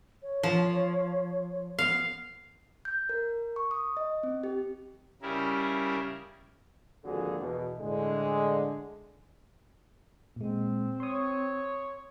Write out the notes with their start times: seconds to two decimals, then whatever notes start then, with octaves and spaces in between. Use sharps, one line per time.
0.23 C#5
0.43 F3
1.79 B3 F5
2.85 G6
3.09 A#4
3.56 C#6
3.71 D#6
3.97 D#5
4.23 C4
4.43 G4
5.22 C#3 G3 E4 A#4
7.05 G#1 D3 F3 A#3 F#4 G#4
7.40 E2 B2
7.78 A2 D3 G#3
10.36 A#2 G#3 C4
11.00 C#5 C6 D#6